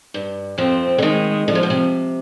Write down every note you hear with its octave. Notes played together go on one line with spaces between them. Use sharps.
G2
F2 F3 C4
D3
D#2 D#3 G#3
D3 F3
C3
B2
C3